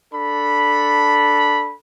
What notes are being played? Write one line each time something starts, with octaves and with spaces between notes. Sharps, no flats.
D4 A4 B5